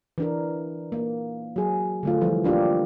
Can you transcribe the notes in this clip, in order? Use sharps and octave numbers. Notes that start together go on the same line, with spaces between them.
E3 D4 A#4
A#3
F#3 G#4
D3 A3 F4
E3 F3 G3
A#3 D4 F4 G4